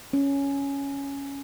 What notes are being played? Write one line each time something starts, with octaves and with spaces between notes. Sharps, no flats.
C#4